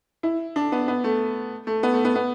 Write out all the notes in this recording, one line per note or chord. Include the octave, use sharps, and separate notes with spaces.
E4
D4
B3
B3
A3
A3
B3
A3
B3
B3